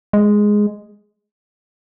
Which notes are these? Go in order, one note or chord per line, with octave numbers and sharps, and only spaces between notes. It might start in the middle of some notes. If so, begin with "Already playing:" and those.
G#3